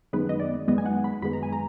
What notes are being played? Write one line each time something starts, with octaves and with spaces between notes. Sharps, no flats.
F#2 D#3 G#3 B3 B4
D#5
D5
F#2 D#3 G#3 B3 D#5
G#5
F#5
B5
F#2 D#3 G#3 B3 B5
A#5
G#5
A#5